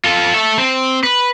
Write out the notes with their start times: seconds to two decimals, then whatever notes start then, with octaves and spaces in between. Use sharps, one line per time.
0.04 F4 A4
0.34 A4 E5
0.58 C4
1.04 B4